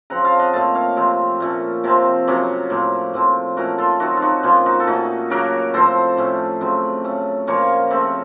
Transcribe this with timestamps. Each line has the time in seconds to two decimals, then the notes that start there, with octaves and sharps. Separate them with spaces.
0.10 C#3 F3 C4 F#5 A#5
0.24 F5 A5
0.39 D#5 F#5
0.53 A#2 A3 C4 F5 A5
0.75 C#5 F5
0.96 C3 F3 C4
1.40 A#2 A3 C#4
1.84 C3 F3 C4
2.27 C3 F#3 A#3 C#4
2.70 A2 F3 A#3
3.14 A2 F3 C4
3.57 A#2 A3 C#4 F#4 A#4
3.78 F4 A4
4.00 D#3 F#3 A3 C4 D#4 F#4
4.17 F4
4.22 D#4 F#4
4.43 A#2 F3 A#3 C#4 F4
4.66 D#4 F#4
4.80 A4
4.87 A#2 A3 C#4 D#4 F#4
5.30 C#3 F#3 A#3 F#4 A#4
5.73 A2 F3 C4 A4 C5
6.17 A2 A3 C#4
6.61 C#3 F#3 C4
7.04 C#3 A3 C#4
7.47 A#2 F3 A#3 C#4 A#4 C#5
7.90 C#3 A3 C4